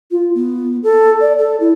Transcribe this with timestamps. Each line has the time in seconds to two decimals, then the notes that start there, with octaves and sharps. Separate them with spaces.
0.11 F4
0.35 B3
0.83 A4
1.21 D5
1.38 A4
1.60 E4